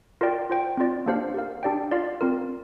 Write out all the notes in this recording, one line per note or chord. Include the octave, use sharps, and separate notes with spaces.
F4 A#4 D5 G5
F4 C5 G5
C4 F4 D5
A#3 D4 G4 C5 F5
G4 A#4 F5
D4 G4 D5 G5
F4 D5 F5
C4 F4 A#4